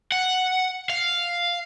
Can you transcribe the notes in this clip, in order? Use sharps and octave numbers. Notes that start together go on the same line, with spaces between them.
F#5
F5